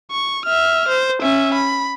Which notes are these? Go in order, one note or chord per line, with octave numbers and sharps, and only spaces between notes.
C#6
E5 F6
C5
C#4 E5
B5